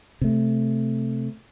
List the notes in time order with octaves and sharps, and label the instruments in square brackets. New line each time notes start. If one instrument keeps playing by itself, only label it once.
[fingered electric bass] C3 A3